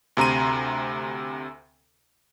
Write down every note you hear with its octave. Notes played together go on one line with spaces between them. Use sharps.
D2 C3 A#5 C6 D#7